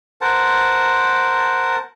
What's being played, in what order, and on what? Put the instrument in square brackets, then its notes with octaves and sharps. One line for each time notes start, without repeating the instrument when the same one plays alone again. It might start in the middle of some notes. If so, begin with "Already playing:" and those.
[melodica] A#4 C5 F#5 A5